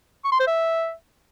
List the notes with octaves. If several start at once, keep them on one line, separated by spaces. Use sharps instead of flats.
C#6
C6
C5
E5